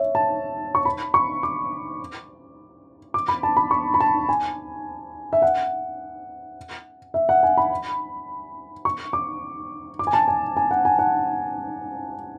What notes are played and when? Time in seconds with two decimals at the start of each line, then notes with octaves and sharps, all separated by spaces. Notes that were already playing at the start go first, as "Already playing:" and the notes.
Already playing: C#5 E5
0.15 A5
0.75 C#6
0.85 B5
1.14 C#6
1.43 D6
3.14 D6
3.28 B5
3.43 A5
3.57 B5
3.71 C#6
3.94 B5
4.00 A5
4.29 G#5
5.33 E5
5.42 F#5
7.14 E5
7.29 F#5
7.43 G#5
7.57 B5
8.85 C#6
9.13 D6
9.99 D6
10.07 G#5
10.13 A5
10.28 G#5
10.57 G#5
10.71 F#5
10.85 G#5
10.99 F#5